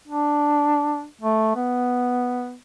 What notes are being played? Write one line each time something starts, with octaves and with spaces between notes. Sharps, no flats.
D4
A3
B3